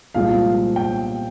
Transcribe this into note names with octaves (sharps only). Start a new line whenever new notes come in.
C2 A#2 F3 G#3 F5
G5